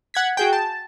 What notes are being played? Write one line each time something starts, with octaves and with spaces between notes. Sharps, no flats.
F#5 G#6 B6
F#4 G#4 G5
A5